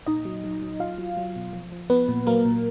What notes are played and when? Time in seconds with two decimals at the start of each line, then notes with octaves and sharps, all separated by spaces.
0.06 A#2 D#4 D#5
0.25 F#3
0.44 F#3
0.62 F#3
0.80 F#3 F4 F5
0.98 F#3
1.17 F#3
1.36 B2
1.53 F3
1.72 F3
1.90 F3 B3 B4
2.08 A#2
2.26 F#3 A#3 A#4
2.45 A#2